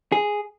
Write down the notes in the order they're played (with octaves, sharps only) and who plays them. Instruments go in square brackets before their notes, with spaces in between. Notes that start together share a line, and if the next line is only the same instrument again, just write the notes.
[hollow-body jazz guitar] G#4